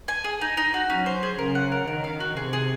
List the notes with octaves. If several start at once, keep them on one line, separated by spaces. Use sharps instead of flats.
G#5
G#4
D#4
D#4
F#4
F#3 C#4
C5
G#4
C#3 A#4
F#5
A#4
D#3 A#4
F5
F#4
C3 G#4
G#4